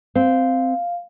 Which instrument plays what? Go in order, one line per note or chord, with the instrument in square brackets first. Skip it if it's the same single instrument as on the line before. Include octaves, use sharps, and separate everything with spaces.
[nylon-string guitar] C4 [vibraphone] F5